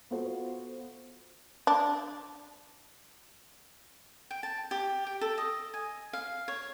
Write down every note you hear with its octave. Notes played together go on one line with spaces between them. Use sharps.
B3 F4 F#4 A4 C5
D4
G5
A5
G4
G5
A4
D#5
G#5
F5
C#5